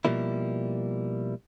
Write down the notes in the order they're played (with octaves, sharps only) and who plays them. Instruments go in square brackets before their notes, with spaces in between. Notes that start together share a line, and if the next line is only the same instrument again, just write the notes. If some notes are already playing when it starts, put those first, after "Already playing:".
[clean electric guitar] B2 D#3 F3 G3 A#3 E4